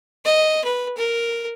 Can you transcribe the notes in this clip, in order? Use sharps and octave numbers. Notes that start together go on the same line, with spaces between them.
D#5
B4
A#4